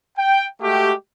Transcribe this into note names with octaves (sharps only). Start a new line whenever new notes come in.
G5
G#3 A3 F#4 G4